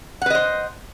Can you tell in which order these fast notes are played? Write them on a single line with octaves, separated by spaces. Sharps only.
F#5 B4 D#5 C5